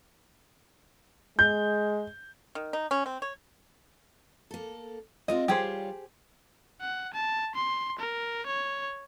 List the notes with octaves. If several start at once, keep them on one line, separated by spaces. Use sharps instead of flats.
G#3 G6
D#3
D#4
C#4
C4
C#5
A#3 A4
G#3 C4 F4 D#5
G3 F4 G4 G#4 C5 C#5
F#5
A5
C6
A#4
C#5